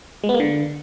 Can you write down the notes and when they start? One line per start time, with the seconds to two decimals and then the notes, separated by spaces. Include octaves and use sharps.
0.24 G#3
0.29 B3
0.34 A#3
0.40 D3